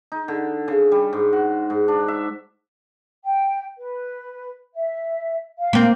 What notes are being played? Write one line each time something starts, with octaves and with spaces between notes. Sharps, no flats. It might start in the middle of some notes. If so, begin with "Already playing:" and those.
D#4
D3
C#3
G3
G#2
F#4
G#2
D4
E5
G5
B4
E5
F5
A#3 C4